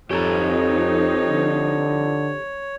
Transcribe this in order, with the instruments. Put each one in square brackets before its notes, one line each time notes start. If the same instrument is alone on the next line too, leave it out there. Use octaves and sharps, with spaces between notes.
[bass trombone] F2 [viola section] F3 C4 D#4 [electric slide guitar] G4 A4 A#5 [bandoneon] C#5
[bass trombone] D3